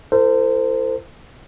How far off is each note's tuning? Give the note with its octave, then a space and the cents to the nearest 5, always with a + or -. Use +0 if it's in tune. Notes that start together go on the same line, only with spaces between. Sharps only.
E4 +40 A4 +45 C5 -15